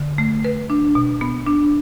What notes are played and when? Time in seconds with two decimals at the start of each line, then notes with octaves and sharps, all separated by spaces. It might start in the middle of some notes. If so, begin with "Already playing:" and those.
Already playing: D3
0.18 A3
0.45 B4
0.70 D4
0.95 B2
1.21 B3
1.47 D4